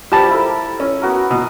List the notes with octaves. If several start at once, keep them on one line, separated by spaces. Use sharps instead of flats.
F3 G3 G4 A5 B5
E4 A4 A#4
C#4
B3 F#4 A#4
B2